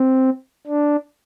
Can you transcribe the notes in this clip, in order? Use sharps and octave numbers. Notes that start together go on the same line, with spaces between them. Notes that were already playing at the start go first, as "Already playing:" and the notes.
Already playing: C4
D4